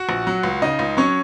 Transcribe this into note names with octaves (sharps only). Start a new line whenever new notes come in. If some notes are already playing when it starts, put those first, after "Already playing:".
Already playing: F#4 F#5
A#1
F#3
C#2
C#3 D#4 D#5
C#2
F#3 C#4 C#5